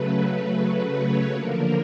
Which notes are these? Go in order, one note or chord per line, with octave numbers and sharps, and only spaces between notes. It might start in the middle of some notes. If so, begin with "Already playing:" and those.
Already playing: C#3 F#3 A3 B4
C#5
D3 F3 A#3 A#4